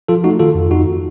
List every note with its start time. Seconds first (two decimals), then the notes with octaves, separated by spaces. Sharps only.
0.08 F3 F4 A4
0.24 A3 D#4 F#4
0.39 D#3 F4 A4
0.55 F2
0.70 F2 D#4 F#4